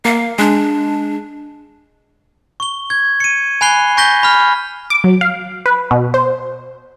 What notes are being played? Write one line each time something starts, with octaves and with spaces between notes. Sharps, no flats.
A#3 F5
G#3 D4
C#6 G7
G#6
C#7 D#7
G#5 B5 F#6 C7 G7
G#5 C#6 G6 A#6 B6 G7
B5 F6
D6
F#3
F5
B4
B2
C5